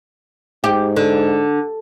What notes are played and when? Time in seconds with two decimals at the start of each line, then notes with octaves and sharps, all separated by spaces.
0.64 G#2 G4
0.97 D3